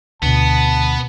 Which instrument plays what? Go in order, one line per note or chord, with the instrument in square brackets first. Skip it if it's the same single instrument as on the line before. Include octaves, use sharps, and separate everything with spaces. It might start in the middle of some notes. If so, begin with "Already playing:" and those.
[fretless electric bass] D2 [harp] B2 D#7 [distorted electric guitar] B3 [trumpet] A5